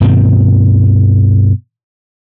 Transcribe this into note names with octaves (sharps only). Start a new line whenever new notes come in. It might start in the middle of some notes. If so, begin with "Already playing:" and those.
G2 B2 D#3 C4